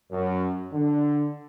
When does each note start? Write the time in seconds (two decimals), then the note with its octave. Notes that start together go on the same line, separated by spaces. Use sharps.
0.11 F#2
0.73 D3